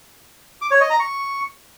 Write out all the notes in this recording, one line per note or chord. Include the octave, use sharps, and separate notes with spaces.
D6
C#5
D#5
A#5
C#6